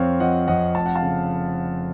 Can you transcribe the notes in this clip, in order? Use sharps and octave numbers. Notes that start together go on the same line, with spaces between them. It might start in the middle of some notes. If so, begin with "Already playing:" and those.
Already playing: F2 C4 C#5 F5
F3 D#5 F#5
F2 D#5 F#5
F1 A5
F#5
F5 A5
C#3